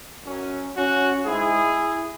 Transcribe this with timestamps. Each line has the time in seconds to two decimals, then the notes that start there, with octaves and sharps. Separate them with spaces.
0.24 F#2 F#3 C#4
0.75 C#4 F#4
1.25 G#2 G#3 E4 G#4